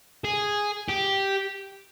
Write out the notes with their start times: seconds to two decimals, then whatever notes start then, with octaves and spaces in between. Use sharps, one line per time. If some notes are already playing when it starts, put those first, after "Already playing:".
0.24 G#4
0.90 G4